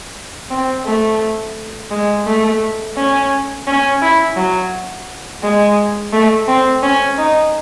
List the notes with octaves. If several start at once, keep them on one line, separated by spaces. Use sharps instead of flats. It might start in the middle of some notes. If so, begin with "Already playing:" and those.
C4
A3
G#3
A3
C#4
C#4
E4
F#3
G#3
A3
C4
C#4
D#4